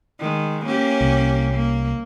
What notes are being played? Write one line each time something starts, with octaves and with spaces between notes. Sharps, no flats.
D#3 G#3
A#3 C#4 G4
C2
A#3